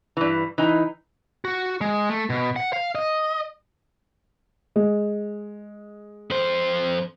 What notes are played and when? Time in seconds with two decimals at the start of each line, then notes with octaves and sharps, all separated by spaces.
0.17 G2 E3
0.58 E3 D#4
1.45 F#4
1.81 G#3
2.10 A3
2.30 B2
2.56 F#5
2.73 F5
2.95 D#5
4.76 G#3
6.30 F2 C5